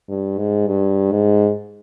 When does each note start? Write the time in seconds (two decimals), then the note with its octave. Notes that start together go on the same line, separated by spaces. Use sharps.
0.09 G2
0.38 G#2
0.67 G2
1.11 G#2